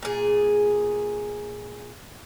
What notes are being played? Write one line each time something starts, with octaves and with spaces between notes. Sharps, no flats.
A#2 G#4